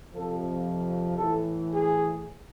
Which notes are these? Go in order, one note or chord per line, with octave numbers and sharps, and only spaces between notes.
F2 C3 F3 A4
A2 E3 A4
G#4